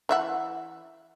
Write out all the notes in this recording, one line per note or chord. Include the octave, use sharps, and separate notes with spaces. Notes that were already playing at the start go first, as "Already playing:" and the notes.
E3 E5 F#5